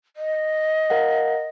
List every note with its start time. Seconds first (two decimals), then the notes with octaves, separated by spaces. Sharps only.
0.16 D#5
0.90 A#4 F5 F#5